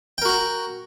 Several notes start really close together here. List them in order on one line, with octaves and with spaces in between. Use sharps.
G5 A#4 F#4 A#5